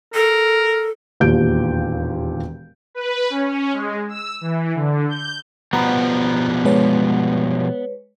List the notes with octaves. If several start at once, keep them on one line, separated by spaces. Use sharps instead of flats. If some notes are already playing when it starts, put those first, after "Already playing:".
A4 A#4
E1 D#2 A#2 G4 G6 D7
B4
C#4
G#3
E6
E3
D3
G6
B2 F3 G3 B3 A#5 B5
G#3 B4 C#5